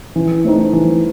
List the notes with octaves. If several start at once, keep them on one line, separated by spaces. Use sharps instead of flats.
E3
A3 C4 D#4
E3